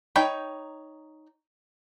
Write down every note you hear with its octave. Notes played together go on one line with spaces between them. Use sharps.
D#4 C#5 G5 B5